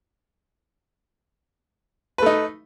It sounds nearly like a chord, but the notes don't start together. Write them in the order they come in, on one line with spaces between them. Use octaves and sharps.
B4 A3 D#4